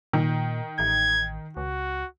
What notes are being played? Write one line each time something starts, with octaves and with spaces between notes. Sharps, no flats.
A#2 D#3
A1 G#6
C#2 F#4